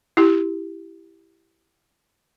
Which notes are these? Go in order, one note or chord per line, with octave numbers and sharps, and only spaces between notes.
E4 G4